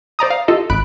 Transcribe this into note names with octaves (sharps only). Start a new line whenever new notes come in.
C5 D5 A#5 D#6
F5
F4 G4 A4 D#5
G#1 B5 F#6 D7